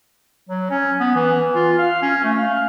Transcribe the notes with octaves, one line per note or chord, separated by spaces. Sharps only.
F#3
C#4
B3
E3
F4
F5
C#4
A3
F5